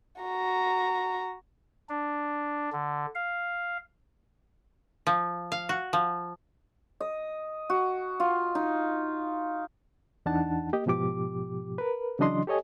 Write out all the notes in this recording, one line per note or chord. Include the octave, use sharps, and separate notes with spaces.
F#4 A#5
D4
D3
F5
F3
F5
F#4
F3
D#5
F#4
F4
D#4
E2 E3 D4 D#4 F#5 A5
A#3 G4 D#5
G#2 B2 F3 G4 D6
A#4 B4
C#3 E3 F#3 D4 D#5 C6
G4 A4 C#5 D#5 G#5